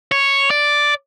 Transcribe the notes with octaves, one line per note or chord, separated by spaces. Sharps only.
C#5
D5